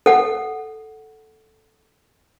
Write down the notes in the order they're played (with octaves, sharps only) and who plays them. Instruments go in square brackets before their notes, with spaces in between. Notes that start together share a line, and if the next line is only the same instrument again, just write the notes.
[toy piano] A4 F#5